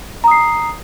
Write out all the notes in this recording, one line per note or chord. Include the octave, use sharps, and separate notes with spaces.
A#5 D#6 C7